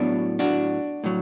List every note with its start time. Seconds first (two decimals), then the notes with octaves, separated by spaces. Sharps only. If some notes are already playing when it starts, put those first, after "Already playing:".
Already playing: A2 F#3 B3 D4 F#4
0.39 D4 F#4
1.04 A2 F#3